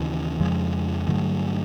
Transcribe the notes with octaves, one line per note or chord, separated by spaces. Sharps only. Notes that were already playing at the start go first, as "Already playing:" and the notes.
Already playing: D#2 C#3 E3
F2 C#3 F3 G#3
G2 D3 F#3 A3